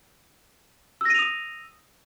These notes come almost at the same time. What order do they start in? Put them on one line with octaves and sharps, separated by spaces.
E6 A#6 D#7 F7 D#6